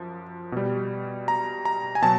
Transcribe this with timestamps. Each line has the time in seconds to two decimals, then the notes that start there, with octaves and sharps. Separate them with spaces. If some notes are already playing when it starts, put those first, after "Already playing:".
Already playing: F#2 F3
0.52 B2 G3
1.28 A#5
1.65 A#5
1.95 G#5
2.02 B2 F#3 A5